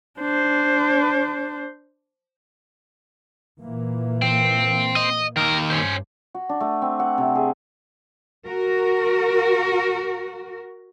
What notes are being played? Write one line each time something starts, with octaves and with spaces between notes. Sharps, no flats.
D4 C5
A#2 E3 A#3
C4
D#5
D#3 A#3 A#4
G2 C#4 C5
F#4
D4
A3
C4
F#5
C3
G#4
F#4 A#4